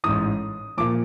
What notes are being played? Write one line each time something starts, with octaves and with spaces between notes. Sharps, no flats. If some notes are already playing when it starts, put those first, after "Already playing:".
A1 G#2 E3 D#6
A#2 F3 D6